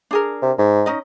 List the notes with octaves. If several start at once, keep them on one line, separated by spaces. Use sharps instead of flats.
D4 G#4 A#4
C3
G#2
C#4 D#4 D#5